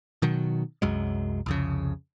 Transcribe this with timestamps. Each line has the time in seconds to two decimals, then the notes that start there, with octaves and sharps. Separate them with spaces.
0.22 B2 D#3 F#3
0.82 C2 F#2 F#3 G#3
1.46 C2 F2 C#3